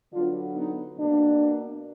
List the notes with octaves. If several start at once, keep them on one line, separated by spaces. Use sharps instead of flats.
D3 F#3 B3 D4 F4
B3 D#4
B2 A#3 D4